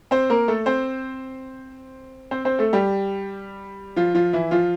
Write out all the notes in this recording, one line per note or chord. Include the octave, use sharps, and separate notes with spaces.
C4 C5
A#3 A#4
A3 A4
C4 C5
C4 C5
C4 C5
A3 A4
G3 G4
F3 F4
F3 F4
E3 E4
F3 F4